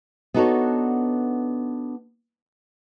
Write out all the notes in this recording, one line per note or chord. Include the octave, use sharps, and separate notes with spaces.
B3 D4 D#4 F#4 A4 C#5